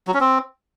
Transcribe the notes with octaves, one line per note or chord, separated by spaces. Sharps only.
F#3
C#4
C4